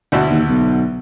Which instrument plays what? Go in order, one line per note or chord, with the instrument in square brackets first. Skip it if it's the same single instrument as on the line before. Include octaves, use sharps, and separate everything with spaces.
[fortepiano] D2 B2 E4
[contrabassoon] D#2
B1